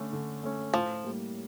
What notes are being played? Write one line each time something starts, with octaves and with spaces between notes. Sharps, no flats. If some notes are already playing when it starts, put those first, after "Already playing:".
Already playing: D3 A3 C#4
D3
A3 C#4
A2 F3
G3 A#3